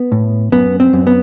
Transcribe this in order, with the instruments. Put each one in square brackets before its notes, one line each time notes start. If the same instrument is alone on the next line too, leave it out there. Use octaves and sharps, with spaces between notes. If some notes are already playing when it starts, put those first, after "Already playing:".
Already playing: [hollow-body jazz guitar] B3
A2
F#2 B3
C4
F#2
B3